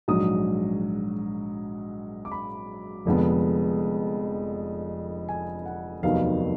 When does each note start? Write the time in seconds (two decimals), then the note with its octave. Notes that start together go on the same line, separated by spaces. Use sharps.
0.08 A#1 G#2 F#3 D#6
2.25 D6
2.32 B5
3.05 F1 F2 D3 G#3 B3
5.29 G#5
5.66 F#5
6.03 F1 D#2 D#3 F#3 B3 F5